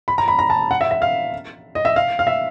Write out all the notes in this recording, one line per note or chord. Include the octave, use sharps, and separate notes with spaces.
B5
A#5
B5
A#5
A5
F#5
E5
E5
F5
D#5
E5
F5
F5
E5